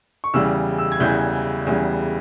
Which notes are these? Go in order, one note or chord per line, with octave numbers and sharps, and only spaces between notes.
C#6
E2 C#3 E3 G3 E6
E6
G#6
E2 C#3 E3 G3 G6
E2 C#3 E3 G3